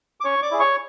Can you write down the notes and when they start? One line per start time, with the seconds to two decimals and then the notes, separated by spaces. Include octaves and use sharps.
0.20 D6
0.24 C#4 C#5 C#6
0.42 D5 D6
0.51 E4 G#4
0.60 C#5 C#6